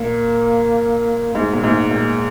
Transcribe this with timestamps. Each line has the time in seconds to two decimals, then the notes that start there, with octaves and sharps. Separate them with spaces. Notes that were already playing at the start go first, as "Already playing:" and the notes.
Already playing: A#2 A#3
1.35 G#2 G#3
1.53 A#2
1.64 G#2
1.91 A#2